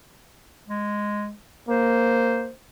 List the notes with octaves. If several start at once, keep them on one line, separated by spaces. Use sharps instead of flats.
G#3
A#3 C5